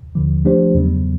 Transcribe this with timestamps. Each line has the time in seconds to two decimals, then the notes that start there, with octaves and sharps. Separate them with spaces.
0.15 D#2 D3 F3
0.45 F3 A3 D4 G4 C5
0.75 E2 C#3 F#3 B3